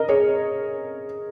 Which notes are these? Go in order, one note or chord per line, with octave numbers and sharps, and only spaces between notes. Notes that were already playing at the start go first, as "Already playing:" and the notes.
Already playing: A#4 D#5
G#4 C#5